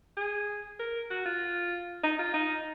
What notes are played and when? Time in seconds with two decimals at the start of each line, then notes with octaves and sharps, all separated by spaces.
0.17 G#4
0.79 A#4
1.10 F#4
1.26 F4
2.04 D#4
2.19 F4
2.34 D#4